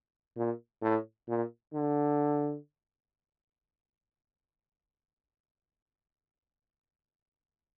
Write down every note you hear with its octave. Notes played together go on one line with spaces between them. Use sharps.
A#2
A2
A#2
D3